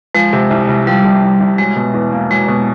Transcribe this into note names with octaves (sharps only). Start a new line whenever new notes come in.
F3 G#3
C3
C2
C2
F3 G3
C3
C2
C2
F#3 G#3
B2
E2
A#3
F#3 G#3
B2